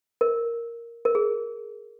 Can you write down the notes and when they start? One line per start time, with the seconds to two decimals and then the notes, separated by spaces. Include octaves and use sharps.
0.21 A#4
1.05 A#4
1.15 G#4